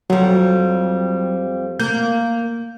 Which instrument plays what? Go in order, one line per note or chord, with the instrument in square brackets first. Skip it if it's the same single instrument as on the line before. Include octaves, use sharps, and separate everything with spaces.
[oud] F2 G3 [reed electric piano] F#3
[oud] A#3 [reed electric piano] G6